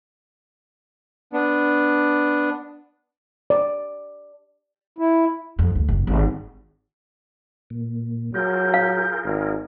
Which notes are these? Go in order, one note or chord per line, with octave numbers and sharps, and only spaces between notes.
B3 D4
D5
E4
F2
D2
F#1
G#1
A#2
F#3 F4 G#4 A#4 G6
F5
G#1